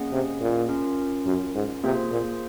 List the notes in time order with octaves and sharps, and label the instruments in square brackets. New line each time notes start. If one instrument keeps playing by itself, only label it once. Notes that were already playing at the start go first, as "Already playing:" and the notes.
Already playing: [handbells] A#3 C#4 G#4 D#5 F#5
[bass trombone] C3
A#2
[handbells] C#4 F4 A#4
[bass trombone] F#2
G#2
[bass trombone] C3 [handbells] A#3 F4 G#4 C5
[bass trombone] A#2